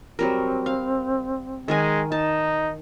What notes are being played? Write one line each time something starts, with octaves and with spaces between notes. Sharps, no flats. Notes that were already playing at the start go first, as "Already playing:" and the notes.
F#3 G3 C4 A#4
F5
D#3 G#3 A#4 G#5
D#4 A5